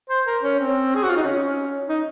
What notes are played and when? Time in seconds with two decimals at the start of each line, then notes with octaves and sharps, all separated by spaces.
0.10 C5
0.26 A#4
0.43 C#4
0.59 C4
0.95 G#4
1.03 F#4
1.10 F4
1.16 D#4
1.24 C#4
1.88 D#4